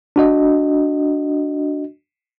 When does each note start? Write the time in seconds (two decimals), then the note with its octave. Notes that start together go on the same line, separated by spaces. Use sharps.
0.16 D4 F#4 D#5